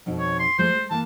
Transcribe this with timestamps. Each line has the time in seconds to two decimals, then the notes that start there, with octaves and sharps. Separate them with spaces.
0.06 F2 B2 D#4
0.19 C#5
0.39 C6
0.59 F3 G#3 A3 C5
0.74 G#3
0.91 E3 A#3 A5